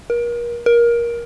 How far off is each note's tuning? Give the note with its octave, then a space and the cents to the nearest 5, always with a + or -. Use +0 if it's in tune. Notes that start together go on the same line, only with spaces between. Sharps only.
A#4 +35
A#4 +20